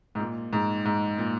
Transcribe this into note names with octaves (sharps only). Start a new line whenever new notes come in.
G#2
A#2
G#2
G#2
A#2